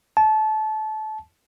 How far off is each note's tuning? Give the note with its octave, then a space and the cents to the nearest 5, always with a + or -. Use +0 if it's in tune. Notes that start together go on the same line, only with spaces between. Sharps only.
A5 -25